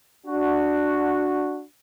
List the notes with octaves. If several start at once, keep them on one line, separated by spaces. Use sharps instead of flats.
D4 F#4